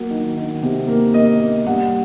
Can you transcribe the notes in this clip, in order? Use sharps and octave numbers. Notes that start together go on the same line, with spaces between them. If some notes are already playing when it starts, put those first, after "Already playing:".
Already playing: F#3 A#3 F#5
D#3
D#3
C3
A#3
A#3 D#5
A#3
G3 F#5